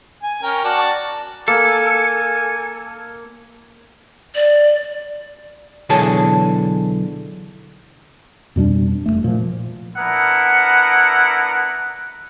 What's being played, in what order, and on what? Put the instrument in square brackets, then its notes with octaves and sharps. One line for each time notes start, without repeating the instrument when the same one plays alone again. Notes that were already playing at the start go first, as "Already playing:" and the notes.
[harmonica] G#5
C#4 A#4 G5
F#4 D5 A5
[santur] A#3 [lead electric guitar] A4 [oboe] G#5
[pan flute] D5
[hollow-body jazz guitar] B1 D3 E3 G#4 C#5 A5
[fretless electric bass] F2 B2 G3 D4
F1 C#2 A3
A#2 F3
[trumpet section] B3 D4 E4 A#4 F#5